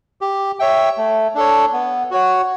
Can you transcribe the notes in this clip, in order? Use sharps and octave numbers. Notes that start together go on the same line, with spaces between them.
G4
C#5 E5 G5
A3
D4 A4 C#5
B3
F#4 C#5 F#5